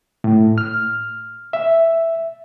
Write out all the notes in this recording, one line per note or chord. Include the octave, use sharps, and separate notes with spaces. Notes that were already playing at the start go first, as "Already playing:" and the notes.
A2
F6
E5